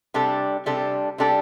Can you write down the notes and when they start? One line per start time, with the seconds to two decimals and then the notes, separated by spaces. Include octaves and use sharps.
0.14 C3 G3 D4 A4
0.66 C3 G3 D4 A4
1.18 C3 G3 D4 A4